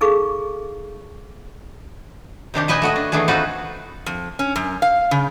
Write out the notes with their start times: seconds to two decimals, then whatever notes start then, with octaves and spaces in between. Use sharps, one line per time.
0.01 D#4 G#4 A4 F5 C#6 D6
2.54 C3 D#3 D4 G4
2.68 A#2 B4 D#5 G5 G#5
2.82 A3 F#4 D#5
2.96 D4
3.12 D#3 E3 A3 D4 G#4
3.28 C4 D#4 F4 F#4 B4
4.06 F2
4.39 C#4
4.56 F#2
4.82 F5
5.11 C#3